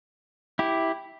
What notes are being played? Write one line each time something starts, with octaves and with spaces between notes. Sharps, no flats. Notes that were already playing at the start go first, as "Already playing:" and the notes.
E4 G4